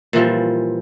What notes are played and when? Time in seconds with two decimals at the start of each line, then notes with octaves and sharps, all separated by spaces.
0.13 A#2 E3 F3 G3